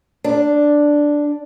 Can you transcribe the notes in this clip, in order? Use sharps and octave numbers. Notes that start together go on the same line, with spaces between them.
D4